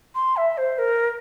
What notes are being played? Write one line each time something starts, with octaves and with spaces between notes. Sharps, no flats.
C6
E5
C5
A#4